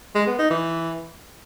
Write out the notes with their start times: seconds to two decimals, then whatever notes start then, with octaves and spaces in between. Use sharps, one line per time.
0.15 G#3
0.27 B3
0.39 D#4
0.51 E3